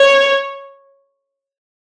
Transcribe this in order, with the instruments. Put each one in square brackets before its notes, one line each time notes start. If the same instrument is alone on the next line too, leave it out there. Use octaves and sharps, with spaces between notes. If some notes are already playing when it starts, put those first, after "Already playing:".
Already playing: [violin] C#5